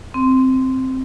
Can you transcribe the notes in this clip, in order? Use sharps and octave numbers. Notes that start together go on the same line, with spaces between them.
C4